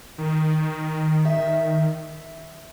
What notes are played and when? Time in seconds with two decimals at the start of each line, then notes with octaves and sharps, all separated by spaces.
0.18 D#3
1.25 E5